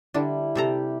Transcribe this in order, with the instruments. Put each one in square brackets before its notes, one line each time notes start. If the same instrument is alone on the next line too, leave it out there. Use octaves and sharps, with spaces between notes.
[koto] D3 D4 [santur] G3 E4
[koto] C3 A4 A#5 [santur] G4